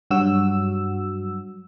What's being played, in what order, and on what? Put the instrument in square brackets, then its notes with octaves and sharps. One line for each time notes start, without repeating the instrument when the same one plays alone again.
[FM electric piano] G2 F#3 F#4 E6